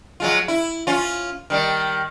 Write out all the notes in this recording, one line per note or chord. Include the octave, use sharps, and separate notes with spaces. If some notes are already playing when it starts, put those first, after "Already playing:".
F#3 G#3 F4
E4
C#4 F4
D#3 G3